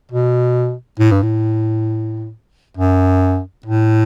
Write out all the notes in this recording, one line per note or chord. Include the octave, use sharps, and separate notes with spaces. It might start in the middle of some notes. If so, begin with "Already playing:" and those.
B2
A2
G2
A2
F#2
A2